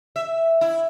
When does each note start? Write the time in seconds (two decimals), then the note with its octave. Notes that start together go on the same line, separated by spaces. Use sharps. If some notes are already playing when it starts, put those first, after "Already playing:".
0.16 E5
0.61 E4